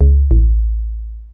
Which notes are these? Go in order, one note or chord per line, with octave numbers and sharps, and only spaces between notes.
C#2
A1